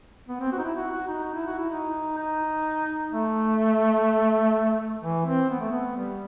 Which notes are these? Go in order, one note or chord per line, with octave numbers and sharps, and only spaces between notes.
B3
C4
F#4
D#4
E4
F#4
F#4
D#4
D#4
E4
F#4
E4
D#4
D#4
A3
E3
C4
B3
A3
B3
G3